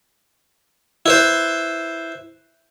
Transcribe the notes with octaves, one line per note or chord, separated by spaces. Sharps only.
E4 B4 C5